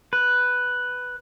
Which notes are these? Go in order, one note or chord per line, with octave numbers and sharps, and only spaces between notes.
B4